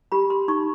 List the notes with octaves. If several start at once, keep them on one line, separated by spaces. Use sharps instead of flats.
G4 B5
C6
D#4 C#6